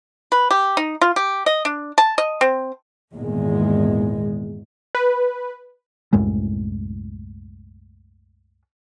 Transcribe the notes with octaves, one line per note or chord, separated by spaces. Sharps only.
B4
G4
D#4
F4
G4
D#5
D4
A5
D#5
C4
G#1 E2 A#2 G#3
B4
C2 F#2 A2 G#3